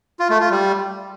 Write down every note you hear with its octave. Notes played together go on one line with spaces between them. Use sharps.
F4
A3
F4
G3